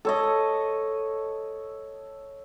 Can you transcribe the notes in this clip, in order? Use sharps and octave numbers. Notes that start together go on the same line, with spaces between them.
A4 C#5 D#5